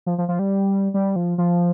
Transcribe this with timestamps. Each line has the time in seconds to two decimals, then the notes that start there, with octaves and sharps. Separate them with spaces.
0.06 F3
0.18 F3
0.28 F3
0.39 G3
0.94 G3
1.16 F3
1.38 F3